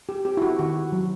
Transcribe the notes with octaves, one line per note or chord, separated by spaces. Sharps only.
G4
C4 G4
E4
F#4
D#3 F#4
F#3